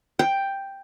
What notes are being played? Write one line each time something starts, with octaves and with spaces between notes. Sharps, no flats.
G5